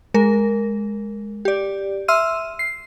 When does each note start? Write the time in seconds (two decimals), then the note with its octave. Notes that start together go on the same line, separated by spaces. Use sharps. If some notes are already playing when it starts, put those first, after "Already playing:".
0.14 G#3 A#4
1.45 G4 D5
2.08 E5 C6 E6 F6 D#7
2.59 C7